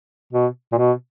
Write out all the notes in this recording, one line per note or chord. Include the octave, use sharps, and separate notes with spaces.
B2
A#2
B2